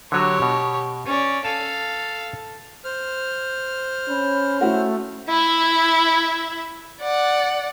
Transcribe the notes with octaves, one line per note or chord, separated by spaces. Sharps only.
D3 F#3 F#4 G4 C#5
B2
C#4 D5
A4 F5 G#5 A5
C5 F6
C#4 B5
A3 E4 F#4
E4 E5
D5 F#5